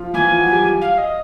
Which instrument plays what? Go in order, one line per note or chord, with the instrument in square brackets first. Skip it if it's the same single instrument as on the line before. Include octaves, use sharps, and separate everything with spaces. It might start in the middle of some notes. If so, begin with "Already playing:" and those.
Already playing: [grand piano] F3 F4
[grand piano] E3 E4 [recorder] G#5
[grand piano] F3 F4
F#3 F#4
G3 G4
[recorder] F5
D#5